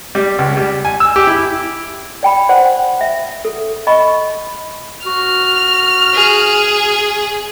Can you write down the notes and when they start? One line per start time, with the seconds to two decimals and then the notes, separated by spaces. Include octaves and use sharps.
0.15 G3
0.38 C#2
0.57 G3
0.85 G#5
1.00 E6
1.16 G4
1.27 E4
2.23 D5 G5 B5
2.49 C5 D5 F#5 C6
3.01 E5
3.45 A4
3.87 D#5 B5 C#6
5.06 F#4 F6
6.14 G#4